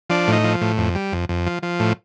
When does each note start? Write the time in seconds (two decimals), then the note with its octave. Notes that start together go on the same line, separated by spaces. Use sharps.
0.10 F3 D4
0.28 A2 D#4
0.44 F3
0.61 A2
0.78 F2
0.95 G3
1.12 F2
1.29 F2
1.47 F3
1.63 F3
1.80 A2